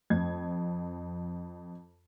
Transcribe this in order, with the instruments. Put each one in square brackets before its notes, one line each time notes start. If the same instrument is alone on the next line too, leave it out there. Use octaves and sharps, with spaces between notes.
[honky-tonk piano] F2 G#6